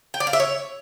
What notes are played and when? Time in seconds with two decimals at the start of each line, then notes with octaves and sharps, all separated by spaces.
0.14 G5
0.20 D5
0.27 F5
0.33 E5
0.40 C#5